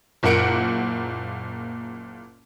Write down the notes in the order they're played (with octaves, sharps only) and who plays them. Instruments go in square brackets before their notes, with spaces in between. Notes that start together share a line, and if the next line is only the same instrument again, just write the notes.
[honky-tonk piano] F#1 A#2 A#3 F#5 C#7 D7